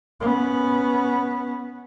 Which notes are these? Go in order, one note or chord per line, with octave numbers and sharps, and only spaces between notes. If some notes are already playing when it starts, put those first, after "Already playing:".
B3 C#4